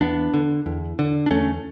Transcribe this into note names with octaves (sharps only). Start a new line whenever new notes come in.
E2 B3 D4
D3
E2
D3
D4
E2 A3 C#4